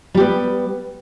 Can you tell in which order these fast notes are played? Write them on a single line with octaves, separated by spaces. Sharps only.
G3 G4 B3